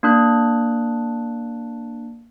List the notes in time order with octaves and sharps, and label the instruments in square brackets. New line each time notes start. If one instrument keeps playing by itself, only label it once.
[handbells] A#3 D4 F#6